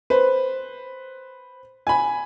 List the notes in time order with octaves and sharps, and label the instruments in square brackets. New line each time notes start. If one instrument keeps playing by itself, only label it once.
[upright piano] B4 C5
G#5 B5